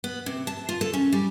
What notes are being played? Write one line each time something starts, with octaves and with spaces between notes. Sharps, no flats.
B3
C3
A5
F4
A4
C#4
G3